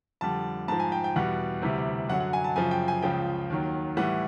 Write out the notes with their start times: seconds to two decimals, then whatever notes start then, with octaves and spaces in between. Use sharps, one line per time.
0.21 F2 D3 G3 A5
0.68 G#2 F3 A5
0.80 G#5
0.92 G5
1.04 G5
1.16 E2 B2 G3 F#5
1.62 D2 C3 E3 G3
2.09 F#2 D3 F#3 F#5
2.20 F#5
2.33 G#5
2.44 A5
2.56 F#2 C#3 F3 G#5
2.71 G5
2.88 G#5
3.02 C#2 C#3 F3 G5
3.50 D#2 D#3 F#3
3.97 A2 E3 G3 F#5